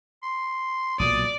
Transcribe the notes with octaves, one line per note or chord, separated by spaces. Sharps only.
C6
B1 A#2 F#3 D5 D#6